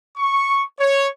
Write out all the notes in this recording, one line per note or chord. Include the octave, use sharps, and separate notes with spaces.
C#6
C#5